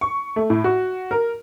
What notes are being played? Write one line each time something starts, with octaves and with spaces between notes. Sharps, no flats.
C#6
A3
A2
F#4
A#4